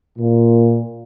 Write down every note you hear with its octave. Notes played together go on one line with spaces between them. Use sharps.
A#2